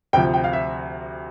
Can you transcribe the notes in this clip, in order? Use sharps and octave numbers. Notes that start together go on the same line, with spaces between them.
D2 C3 F3 G5
G5
F5
E5